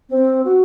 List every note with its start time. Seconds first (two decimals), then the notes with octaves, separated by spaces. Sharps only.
0.09 C4
0.45 F#4